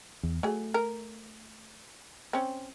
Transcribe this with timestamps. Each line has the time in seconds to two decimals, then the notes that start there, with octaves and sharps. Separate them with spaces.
0.23 E2
0.43 F#3 A3 G#4
0.74 A#4
2.33 C4 C#4